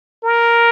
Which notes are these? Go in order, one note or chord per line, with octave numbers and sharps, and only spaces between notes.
A#4